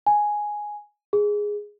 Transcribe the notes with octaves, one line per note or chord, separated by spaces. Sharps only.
G#5
G#4